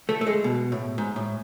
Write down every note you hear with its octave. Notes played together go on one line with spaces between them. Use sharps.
A3
A3
G#3
B2
A2
G#2
A2